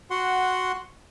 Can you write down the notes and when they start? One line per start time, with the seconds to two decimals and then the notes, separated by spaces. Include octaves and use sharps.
0.11 F#4 F#5 C6